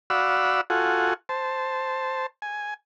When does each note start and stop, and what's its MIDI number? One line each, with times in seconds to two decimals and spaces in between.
0.10 0.61 66
0.10 0.61 74
0.10 0.61 77
0.10 0.61 78
0.10 0.61 83
0.10 0.61 88
0.70 1.14 65
0.70 1.14 66
0.70 1.14 69
0.70 1.14 78
0.70 1.14 80
1.29 2.26 72
1.29 2.26 81
2.42 2.74 80